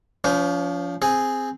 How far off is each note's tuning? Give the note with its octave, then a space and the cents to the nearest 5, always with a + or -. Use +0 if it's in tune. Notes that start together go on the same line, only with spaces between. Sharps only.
F3 +0 C#4 +40 C5 -15
C4 +0 G#4 +0